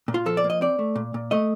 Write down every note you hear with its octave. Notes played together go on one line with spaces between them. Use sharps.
A#2
F4
F3 A4
D5
A#3
D#5
C4 D5
A3
A#2
A#2
A3 D#5